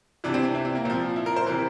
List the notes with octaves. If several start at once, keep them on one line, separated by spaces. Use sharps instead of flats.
C3 E3 D4
C4
D4
E4
C4
A#3
A#2 F3 C4
E4
A#4
C5
C3 E3 A#4